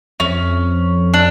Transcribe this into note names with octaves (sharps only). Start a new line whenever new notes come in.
F2 C#4
D4